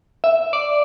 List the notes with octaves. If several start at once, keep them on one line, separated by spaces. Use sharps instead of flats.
E5
D5